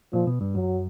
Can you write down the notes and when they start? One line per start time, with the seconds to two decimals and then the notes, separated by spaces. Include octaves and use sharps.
0.13 A#2 F3
0.27 B2
0.41 G2
0.55 F#2 F#3